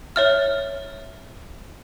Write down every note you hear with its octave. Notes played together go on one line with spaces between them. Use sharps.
C#5 E5 F6